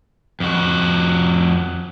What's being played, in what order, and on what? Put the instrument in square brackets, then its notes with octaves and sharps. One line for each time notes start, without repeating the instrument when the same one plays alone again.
[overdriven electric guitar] F2 F#4